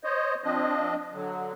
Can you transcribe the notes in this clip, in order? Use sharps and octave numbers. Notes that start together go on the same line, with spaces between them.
C5 C#5 D#5
F3 C4 D4 D#5
D3 F#3